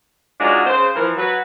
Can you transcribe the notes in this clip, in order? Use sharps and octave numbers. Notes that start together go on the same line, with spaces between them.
F#3 G#3 D4 D#4 F4 F#4
C#3 C5
E3 F3 A#4
F#3 B4